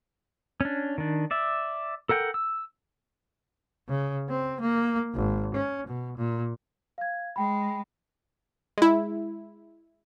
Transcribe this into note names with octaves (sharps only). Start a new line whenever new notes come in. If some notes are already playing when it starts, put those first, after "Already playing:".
C#4 D4
D#3 D4
D5 E5
A4 A#4 F#5 G5
E6
C#3
C4
A#3
G#1
C#4
B2
A#2
F5 G#6
G#3 G5 B5
G#3 E4